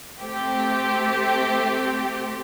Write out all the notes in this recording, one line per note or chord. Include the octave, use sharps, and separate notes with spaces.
A3 C4 G4